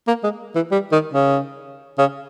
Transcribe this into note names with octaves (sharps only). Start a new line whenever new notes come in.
A#3
G#3
E3
G3
D#3
C#3
C#3